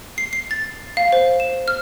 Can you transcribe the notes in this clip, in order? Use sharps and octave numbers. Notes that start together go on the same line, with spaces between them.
C7
C7
A6
F5
C5
E7
F6